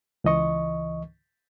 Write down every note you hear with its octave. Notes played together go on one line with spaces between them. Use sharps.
C#2 E3 D#5 C#6